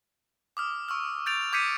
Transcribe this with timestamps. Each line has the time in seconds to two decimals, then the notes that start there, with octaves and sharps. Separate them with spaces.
0.57 D6 D#6 F6
0.88 C#6 E6 F6
1.26 G6 A6 D7 F7
1.53 D6 G6 G#6 B6 C#7 D#7